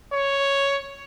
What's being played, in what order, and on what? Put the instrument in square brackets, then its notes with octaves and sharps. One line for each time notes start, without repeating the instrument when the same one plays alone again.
[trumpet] C#5